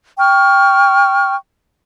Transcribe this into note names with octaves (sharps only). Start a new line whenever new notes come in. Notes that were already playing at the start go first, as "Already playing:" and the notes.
G5 C#6 F6